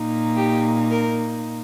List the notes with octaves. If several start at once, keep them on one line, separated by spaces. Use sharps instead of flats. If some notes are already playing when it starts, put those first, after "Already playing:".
Already playing: A#2 A#3 D#4
G4
A#4